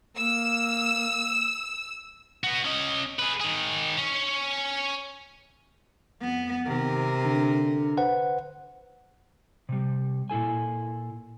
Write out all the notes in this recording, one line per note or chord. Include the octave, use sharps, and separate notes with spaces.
A#3 E6
B3 F#4
C#4 D#5
G#4 B4
D#3 G#4
C#4
F2 B3
C3 D#3 A#4
D3
B4 C5 F#5
C3 G3
A#2 E4 A4 G#5